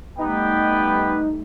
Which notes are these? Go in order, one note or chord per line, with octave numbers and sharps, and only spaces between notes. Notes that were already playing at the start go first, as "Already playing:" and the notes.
G3 A3 B3 D#4 G4 B4 G5